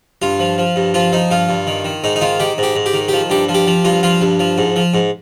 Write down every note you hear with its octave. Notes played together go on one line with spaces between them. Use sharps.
G2 F4
F3
F3
G2
F3 F4
F3 D#4
G2 F4
G2
D#3
D#3
G#2 D#4
D#4
D#3 F4
D#3 G4
G#2 G4
G#2
G4
D#3
F3 G4
G2 G4
F3
G4
F3
G2 F4
F3 F4
G2
F3
G#2
F3
G#2